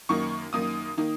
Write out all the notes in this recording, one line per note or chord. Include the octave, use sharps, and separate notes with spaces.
F#2 D#3 A#3 D#4 C#6
F#2 D#3 A#3 D#4 D#6
D#3 A#3 D#4